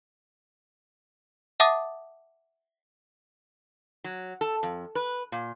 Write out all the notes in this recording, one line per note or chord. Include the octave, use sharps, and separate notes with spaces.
E5 F#5 A5 D6 D#6 A6
F#3
A4
F2
B4
A#2